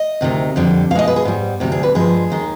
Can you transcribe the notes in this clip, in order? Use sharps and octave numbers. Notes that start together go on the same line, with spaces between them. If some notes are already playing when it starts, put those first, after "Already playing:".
Already playing: D#5
D2 C3 D#3
F2 D3 G3
B2 G#3 D#5 F5
B4
G#4
G#2 G3
D2 C3 G3
G#4
B4
G2 F3 G#3 G#4
D#2 D#3 G#3